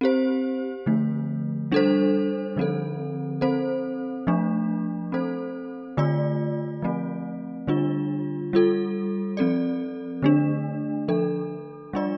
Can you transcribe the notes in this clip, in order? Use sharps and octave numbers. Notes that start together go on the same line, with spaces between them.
C4 G4 C5
D3 F3 A3
G3 D4 A4 C5
D3 F3 C4 A4
C4 A4 C5
F3 A3 D4
C4 A4 C5
D3 A3 F4 D5
F3 A3 C4
D3 G3 D4 F4
G3 F4 A4
F3 C4 A4 D5
D3 A3 D4
F3 D4 A4
G3 D4 F4 D5